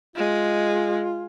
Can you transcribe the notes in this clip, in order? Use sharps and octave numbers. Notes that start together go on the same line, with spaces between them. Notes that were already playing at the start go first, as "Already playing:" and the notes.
G#3 F4